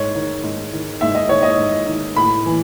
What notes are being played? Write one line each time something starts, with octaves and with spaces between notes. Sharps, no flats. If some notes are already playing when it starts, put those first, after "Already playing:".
Already playing: G#2 C#5
D#3
G#2
D#3
G#2 E5
D#5
D#3 C#5
D#5
G#2
D#3
A2 B5
E3